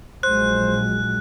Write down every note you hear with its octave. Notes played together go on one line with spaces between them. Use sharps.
A#1 F#3 G#3 C5 F#6